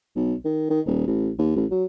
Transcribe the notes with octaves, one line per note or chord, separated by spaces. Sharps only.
B1
D#3
D#3
D#1
A1
D#2
A1
F#3